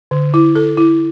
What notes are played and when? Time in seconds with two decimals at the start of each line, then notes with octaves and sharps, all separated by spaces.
0.11 D3
0.34 E4
0.55 A4
0.77 E4